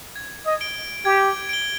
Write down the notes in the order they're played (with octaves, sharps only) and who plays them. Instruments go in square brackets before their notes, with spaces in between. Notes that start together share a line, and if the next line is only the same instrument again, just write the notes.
[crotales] G#6
[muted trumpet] D#5
[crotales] D7 G7
[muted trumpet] G4 [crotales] G#6
[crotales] D7 G7